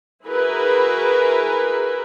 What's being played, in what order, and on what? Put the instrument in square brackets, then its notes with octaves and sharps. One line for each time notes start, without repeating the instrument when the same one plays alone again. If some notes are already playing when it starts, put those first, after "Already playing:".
[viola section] E4 F#4 G#4 A#4 B4